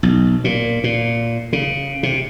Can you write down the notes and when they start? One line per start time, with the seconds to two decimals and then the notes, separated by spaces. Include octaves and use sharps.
0.03 B1
0.44 A#2
0.84 A#2
1.53 C#3
2.03 C3